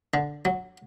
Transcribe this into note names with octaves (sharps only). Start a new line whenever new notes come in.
D3
F#3